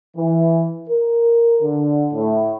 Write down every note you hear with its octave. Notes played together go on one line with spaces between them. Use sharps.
E3
A#4
D3
A2